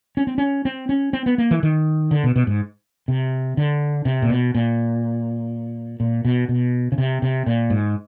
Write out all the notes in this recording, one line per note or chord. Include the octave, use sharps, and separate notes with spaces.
C#4
C4
C#4
C4
C#4
C4
B3
A#3
E3
D#3
D3
B2
B2
G#2
C3
D3
C3
A#2
B2
A#2
A#2
B2
B2
C#3
C3
C3
A#2
G#2